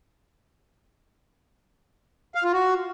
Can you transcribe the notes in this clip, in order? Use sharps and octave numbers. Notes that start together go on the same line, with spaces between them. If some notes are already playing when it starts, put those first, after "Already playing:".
F5
F4
F#4